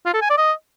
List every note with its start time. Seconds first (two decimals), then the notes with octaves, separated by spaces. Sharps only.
0.06 F4
0.14 A4
0.22 G#5
0.30 D5
0.38 D#5